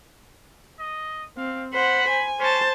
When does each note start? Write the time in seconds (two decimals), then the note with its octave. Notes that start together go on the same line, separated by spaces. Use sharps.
0.79 D#5
1.37 C4 F5
1.73 C5 F#5 B5
2.09 G#5
2.40 C#4 C5 A5